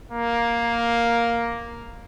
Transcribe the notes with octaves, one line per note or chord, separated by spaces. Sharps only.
A#3